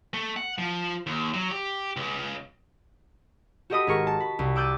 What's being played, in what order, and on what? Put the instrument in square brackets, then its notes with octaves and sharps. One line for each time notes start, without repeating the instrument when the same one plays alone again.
[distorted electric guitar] A3
F#5
F3
D#2
F#3
G4
C#2
[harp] F#4 G4 A4 D#5 B5 D#6
G#1 G#4 A#4 C#6
A5
B5
C2
D6 E6 F#6 G6 A6 D#7